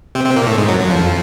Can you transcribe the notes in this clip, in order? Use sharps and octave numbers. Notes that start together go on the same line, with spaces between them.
C3 C4
C3 C4
A#2 A#3
A2 A3
G#2 G#3
F#2 F#3
F#2 F#3
F2 F3